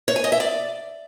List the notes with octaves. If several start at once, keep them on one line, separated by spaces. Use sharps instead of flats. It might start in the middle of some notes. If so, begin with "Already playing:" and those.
C#5
G#5
D#5
E5
D5